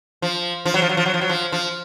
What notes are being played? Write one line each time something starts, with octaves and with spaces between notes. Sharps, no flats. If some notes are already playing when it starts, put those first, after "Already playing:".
F3
F3
F#3
F3
F#3
F3
F#3
F3
F#3
F3
F3